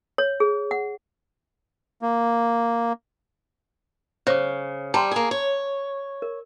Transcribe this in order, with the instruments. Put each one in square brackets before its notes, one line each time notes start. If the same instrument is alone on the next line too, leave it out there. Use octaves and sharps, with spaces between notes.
[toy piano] C#5
G#4
F#5
[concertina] A#3
[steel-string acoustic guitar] C#3 [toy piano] C5 D6
[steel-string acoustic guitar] G3 [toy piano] A5 A#5 C6
[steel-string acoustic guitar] A#3 G#4
C#5
[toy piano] A#4